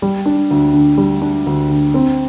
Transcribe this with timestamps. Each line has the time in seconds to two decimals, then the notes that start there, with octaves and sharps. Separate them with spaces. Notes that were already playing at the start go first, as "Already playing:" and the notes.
0.02 G3
0.26 D4
0.51 D2
0.73 D3
0.98 G3
1.22 D4
1.46 D2
1.70 D3
1.94 C4